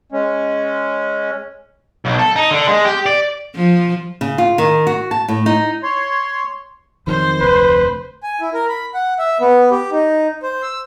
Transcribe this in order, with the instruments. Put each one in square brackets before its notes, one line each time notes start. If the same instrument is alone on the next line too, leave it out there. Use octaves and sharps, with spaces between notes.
[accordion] G#3 C#4
[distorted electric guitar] B1
A4
D#4
D3
G#3
G4
D5
[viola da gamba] F3
[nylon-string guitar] C#3
F4
D#3
F#4
A5
A2
D#4
[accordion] C#5 C6
[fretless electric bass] F2 D#3 F#3 [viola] C5
[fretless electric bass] F1 D2 [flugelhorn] B4
[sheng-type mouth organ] G#5
E4
A#4
B5
F#5
E5
B3
G4
D#4
C5
E6